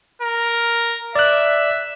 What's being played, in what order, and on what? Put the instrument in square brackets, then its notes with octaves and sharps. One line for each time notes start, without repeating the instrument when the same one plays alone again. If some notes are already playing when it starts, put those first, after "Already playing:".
[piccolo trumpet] A#4
[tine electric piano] D5 F#6 [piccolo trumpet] E5